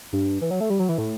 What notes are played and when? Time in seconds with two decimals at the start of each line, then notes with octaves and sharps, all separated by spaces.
0.12 G2
0.41 E3
0.51 F#3
0.60 A3
0.70 G3
0.79 F#3
0.89 E3
0.98 A2